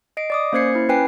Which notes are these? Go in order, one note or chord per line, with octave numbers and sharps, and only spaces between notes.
D#5 C7 D7
D5 D6 D#6
A#3 C#4 C5 G#6 C7 C#7
E4
C#4 B4 G5 G#5 C7